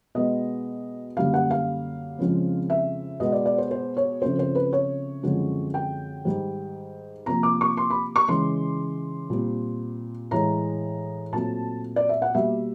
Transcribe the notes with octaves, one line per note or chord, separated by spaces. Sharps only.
B2 G#3 B3 D#5
F#2 D3 G3 A#3 F5
F#5
F5
F2 C#3 F3 G#3 C4
E5
B2 G#3 B3 D#5
D5
D5
C5
C5
C#5
C#3 F3 A3 C4 C5
C5
B4
C#5
F#2 D3 F3 G#3 C4
G5
G#2 D#3 G3
C3 F3 A#3 A#5
D6
C#6
C6
B5
C#6
C#3 E3 G#3 C6
A#2 G3 C4
A2 E3 G#3 A#5
A#2 F#3 A3 C4 A5
D5
E5
F#5
B2 G3 A#3 E5